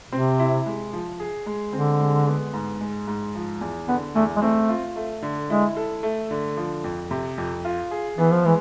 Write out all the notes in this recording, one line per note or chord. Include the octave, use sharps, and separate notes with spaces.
C3 C4
E4
G#3
F3
G#4
G#3
D3 C4
G#3
B3
G#2
G#3
G#2
F3
E2
D3 B3
E2 A3
G#3
A3 C4
F4
A3
D3
G#3 E4
A4
A3
D3
F3
F2
C3
F2
F4
G#4
E3 B3
F3
E3 G#3